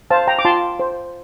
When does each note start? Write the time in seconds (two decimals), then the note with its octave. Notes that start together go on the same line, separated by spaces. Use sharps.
0.10 C5 F5 A5
0.27 G5 A#5
0.39 D6
0.45 F4 A5 C6
0.80 C5